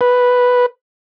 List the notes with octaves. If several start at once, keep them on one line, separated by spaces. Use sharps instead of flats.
B4